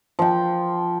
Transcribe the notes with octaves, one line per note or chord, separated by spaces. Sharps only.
F3 G5